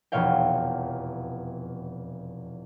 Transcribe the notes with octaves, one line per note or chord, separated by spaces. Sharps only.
F1 E2 B2 C#5 F5 G5